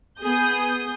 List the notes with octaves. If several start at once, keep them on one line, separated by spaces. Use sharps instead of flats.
B3 G#4 D#6 G6